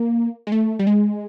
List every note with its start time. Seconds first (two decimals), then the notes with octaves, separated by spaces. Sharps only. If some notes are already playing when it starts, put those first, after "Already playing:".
Already playing: A#3
0.47 G#3
0.52 A3
0.79 G3
0.87 G#3